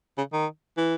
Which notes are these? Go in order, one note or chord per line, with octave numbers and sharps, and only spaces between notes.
C#3
D#3
E3